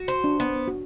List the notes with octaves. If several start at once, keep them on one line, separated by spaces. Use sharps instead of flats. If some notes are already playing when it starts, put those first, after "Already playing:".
Already playing: F#4
C5
D4
B3
F#4